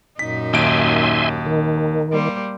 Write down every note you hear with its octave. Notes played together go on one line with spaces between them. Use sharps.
F#2 A#2 D#4 B6
D#2 E5 G#5 C6 D7
D#3
G3 A#3 C5